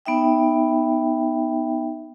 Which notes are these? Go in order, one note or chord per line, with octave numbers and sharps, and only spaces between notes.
B3 D#4 E5 G5